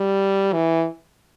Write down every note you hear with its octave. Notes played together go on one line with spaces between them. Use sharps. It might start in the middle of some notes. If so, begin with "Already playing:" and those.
Already playing: G3
E3